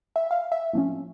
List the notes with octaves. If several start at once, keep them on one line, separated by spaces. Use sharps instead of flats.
E5
F5
E5
A2 F3 A3 C#4